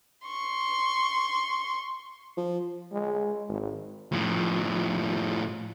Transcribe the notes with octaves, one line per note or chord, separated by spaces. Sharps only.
C6 C#6
F3
G#3
G#1
A2 F3